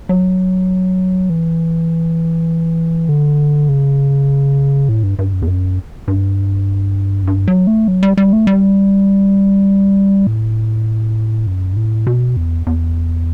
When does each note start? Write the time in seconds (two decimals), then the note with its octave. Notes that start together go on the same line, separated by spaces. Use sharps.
0.09 F#3
1.30 E3
3.09 D3
3.69 C#3
4.89 A2
5.03 G2
5.19 G2
5.33 F#2
5.42 E2
5.48 F#2
6.08 G2
7.23 F#2
7.27 G2
7.48 F#3
7.67 A3
7.88 F#3
8.03 G3
8.17 G3
8.33 A3
8.47 G3
10.27 A2
11.47 F#2
11.72 G2
11.77 A2
12.07 B2
12.37 E2
12.67 E2